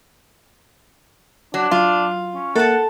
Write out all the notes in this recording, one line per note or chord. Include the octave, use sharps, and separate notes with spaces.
F#3 D4
F#3 F4
C#4
A#3 A4 A#4 E5 F#5 A5